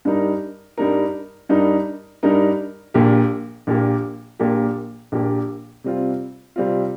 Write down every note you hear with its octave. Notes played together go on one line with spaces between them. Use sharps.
G2 G3 D#4 A#4
G2 G3 D#4 A#4
G2 G3 D#4 A#4
G2 G3 D#4 A#4
A#1 A#2 A#3 G4
A#1 A#2 A#3 G4
A#1 A#2 A#3 G4
A#1 A#2 A#3 G4
C3 G3 C4 F4
C3 G3 C4 F4